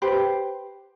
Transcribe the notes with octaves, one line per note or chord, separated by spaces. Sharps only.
G4 B4 C5